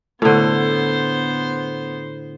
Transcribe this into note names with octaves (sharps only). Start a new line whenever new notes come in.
A2 D3 B3 C5